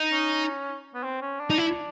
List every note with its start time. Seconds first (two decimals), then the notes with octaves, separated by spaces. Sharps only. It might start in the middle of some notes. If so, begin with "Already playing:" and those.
Already playing: D#4
0.11 C#4
0.94 B3
1.03 C4
1.21 C#4
1.40 D4
1.50 D#4
1.58 E4